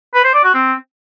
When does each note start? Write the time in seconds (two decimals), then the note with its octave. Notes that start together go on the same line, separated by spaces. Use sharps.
0.14 B4
0.24 C5
0.34 D5
0.44 F#4
0.54 C4